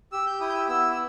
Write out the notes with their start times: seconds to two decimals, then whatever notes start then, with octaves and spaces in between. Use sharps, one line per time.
0.12 G4 E6
0.26 G6
0.41 E4 D#6
0.49 G6
0.54 E6
0.69 B3 E6
0.92 E6